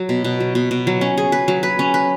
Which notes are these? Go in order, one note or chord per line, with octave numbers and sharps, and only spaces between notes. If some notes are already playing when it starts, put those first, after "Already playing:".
Already playing: F#3
B2
B2
F#3
B2
B2
F#3
C#4
G#4
B4
F#3
B4
C#4
B4